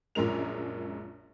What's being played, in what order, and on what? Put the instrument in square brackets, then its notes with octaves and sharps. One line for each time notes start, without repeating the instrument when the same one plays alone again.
[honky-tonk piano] A#1 F#2 F3 G#3 A#4 F7